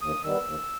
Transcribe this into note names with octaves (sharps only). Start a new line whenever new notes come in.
D#2 D#6
D#3 G3 B3 E6
D#2